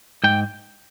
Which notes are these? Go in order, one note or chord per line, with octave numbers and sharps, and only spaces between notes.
G#2 G5